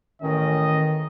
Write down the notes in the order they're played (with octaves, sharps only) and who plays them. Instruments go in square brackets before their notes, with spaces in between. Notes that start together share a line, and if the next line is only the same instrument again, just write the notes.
[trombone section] A1 C#4 [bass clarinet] D#3 [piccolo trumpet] D#5